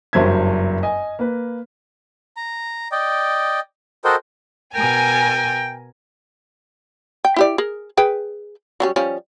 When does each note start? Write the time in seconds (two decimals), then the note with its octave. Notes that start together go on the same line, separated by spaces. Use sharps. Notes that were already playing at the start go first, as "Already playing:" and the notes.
0.13 F#1 G2 F#3 C5 E5 G#6
0.83 D#5 G#5
1.19 A#3 B4
2.37 A#5
2.92 D5 D#5 G5
4.05 F#4 A4 A#4 C5 D#5 G5
4.75 B2 A#4 G5 G#5
7.25 G5
7.36 E4 G4 D5
7.58 G#4 A#4
7.97 G#4 B4 G5
8.80 F#3 G3 C#4
8.96 F3 G3 C#4